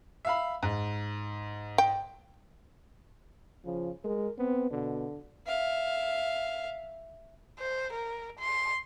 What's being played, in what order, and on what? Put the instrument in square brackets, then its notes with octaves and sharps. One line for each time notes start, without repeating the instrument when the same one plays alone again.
[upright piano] E5 F5 B5
G#2
[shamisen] G5
[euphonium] C#3 [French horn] F3
[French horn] G#3 [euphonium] A#4
[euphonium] B3 [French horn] C4
[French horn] B2 [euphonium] D3
[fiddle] E5 F5
[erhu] C5
A#4
C6